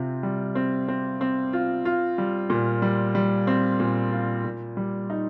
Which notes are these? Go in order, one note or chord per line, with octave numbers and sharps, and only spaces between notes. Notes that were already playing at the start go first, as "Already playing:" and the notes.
Already playing: C3 C4 F4
G3
C4
C4
C4
F4
F4
G3
A#2
G3
G3
C4
A#2
F4
A#2
G3
D#4